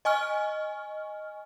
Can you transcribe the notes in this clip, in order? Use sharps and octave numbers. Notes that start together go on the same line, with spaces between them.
D#5 G#5 C#6 F6